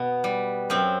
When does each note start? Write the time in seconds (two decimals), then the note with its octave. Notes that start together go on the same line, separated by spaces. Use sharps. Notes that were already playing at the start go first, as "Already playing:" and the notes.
Already playing: B2 B3
0.24 G3
0.70 F#2 C4